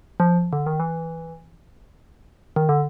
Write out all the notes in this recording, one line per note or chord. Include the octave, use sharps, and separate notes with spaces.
F3
D3
D#3
E3
D#3
D3